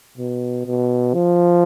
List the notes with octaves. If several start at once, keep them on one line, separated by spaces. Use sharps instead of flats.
B2
B2
F3